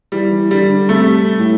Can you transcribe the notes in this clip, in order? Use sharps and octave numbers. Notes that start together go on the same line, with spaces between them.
E3 G3
E3
D3 G3
D3
C3 A3
A2